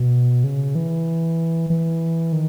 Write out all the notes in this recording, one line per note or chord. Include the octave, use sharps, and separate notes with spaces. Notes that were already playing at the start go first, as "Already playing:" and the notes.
Already playing: B2
C#3
E3
E3
D#3